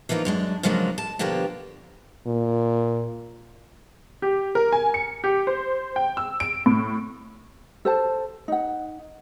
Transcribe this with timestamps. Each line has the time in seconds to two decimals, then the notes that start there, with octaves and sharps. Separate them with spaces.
0.09 E3 F3 A#3 D#4 F4
0.25 F#2 G#3 D4
0.63 C#3 F3 F#3 G#3 A#3 D4
0.98 A5
1.19 B2 D3 F3 A#3 D4 G4
2.27 A#2
4.22 G4
4.55 A#4
4.72 G#5
4.94 C#7
5.24 G4
5.47 C5
5.96 G5
6.17 E6
6.40 D7
6.66 A2
7.85 A4 C5 A5
8.48 D#4 F#5